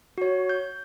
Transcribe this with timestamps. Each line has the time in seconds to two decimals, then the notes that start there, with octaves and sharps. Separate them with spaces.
0.18 F#4 C#5
0.49 G6